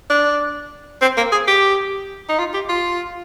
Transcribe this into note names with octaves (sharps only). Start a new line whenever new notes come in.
D4
C4
A#3
G#4
G4
D#4
F4
G4
F4